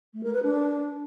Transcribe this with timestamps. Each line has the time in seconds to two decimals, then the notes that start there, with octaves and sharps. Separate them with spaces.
0.13 A3
0.23 A#4
0.33 B4
0.43 D4